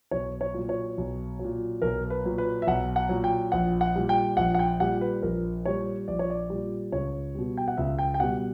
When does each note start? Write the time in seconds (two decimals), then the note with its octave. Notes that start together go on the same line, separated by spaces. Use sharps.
0.11 B1 C#5
0.41 C#5
0.54 A#2 F#3
0.69 C#5
0.97 B1
1.39 F#3
1.44 A#2
1.82 B1 A#4
2.10 B4
2.25 A#2 F#3
2.38 B4
2.62 E5
2.67 B1 F#5
2.96 F#5
3.09 A#2 F#3
3.24 G5
3.52 A#1 F#5
3.81 F#5
3.95 A#2 G3
4.09 G5
4.37 A#1 F#5
4.55 F#5
4.59 G5
4.80 A#2 G3 F#5
5.01 B4
5.22 A#1 A#4
5.65 A#2 G3 C#5
6.08 A#1 D5
6.19 C#5
6.30 D5
6.50 A#2 G3
6.92 C#2 C#5
7.35 B2 G3
7.57 G5
7.68 F#5
7.77 C#2 E5
7.99 G5
8.14 G5
8.20 B2 G3 F#5